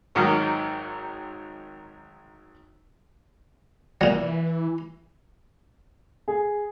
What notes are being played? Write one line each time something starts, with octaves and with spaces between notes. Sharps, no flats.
G#1 G#2 D#3 F#3 D#4 F6
A#2 E3 F#3
G#4